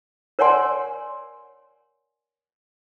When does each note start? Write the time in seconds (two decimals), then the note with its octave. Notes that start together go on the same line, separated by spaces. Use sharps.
0.39 A#4 C#5 D5 F#5 G#5 C6